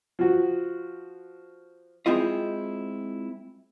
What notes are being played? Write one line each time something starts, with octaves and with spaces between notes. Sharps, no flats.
F3 F#4
G#3 C4 E4 F4 D#5